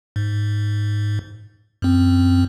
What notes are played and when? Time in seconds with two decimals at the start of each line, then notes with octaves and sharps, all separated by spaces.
0.16 G#2
1.82 F#2 C4